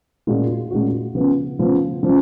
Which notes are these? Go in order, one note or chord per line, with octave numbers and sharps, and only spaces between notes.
A#2 G#3 C#4 F#4
A#2 G#3 C#4 F#4
C#3 F3 B3
C#3 F3 B3
C#3 F3